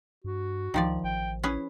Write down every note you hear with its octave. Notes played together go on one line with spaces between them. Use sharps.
G2 F#4
C#2 D#3 F3 D5
A1 G5
C#4 E4 G#4 B4